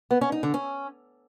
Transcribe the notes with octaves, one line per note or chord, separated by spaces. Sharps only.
B3
C#4
D#4
D3
C#4